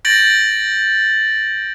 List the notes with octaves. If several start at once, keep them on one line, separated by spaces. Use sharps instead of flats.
G6 A6 A#6 D7 F#7